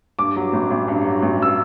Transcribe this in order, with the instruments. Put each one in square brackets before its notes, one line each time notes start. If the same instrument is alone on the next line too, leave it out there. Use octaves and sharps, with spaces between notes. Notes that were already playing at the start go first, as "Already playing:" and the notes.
[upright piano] G2 D6
F#3
A1
A1
G2
F#3
A1
E6